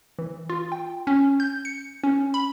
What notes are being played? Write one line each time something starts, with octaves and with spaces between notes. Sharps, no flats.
E3
F4
G5
C#4
G6
C#7
C#4
B5